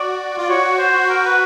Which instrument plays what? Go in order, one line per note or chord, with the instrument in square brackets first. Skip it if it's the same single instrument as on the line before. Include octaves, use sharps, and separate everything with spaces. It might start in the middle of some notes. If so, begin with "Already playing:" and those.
Already playing: [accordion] F#4 [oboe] D5
[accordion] F4
[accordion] F#4 [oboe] C#5
[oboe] C5
A#4
B4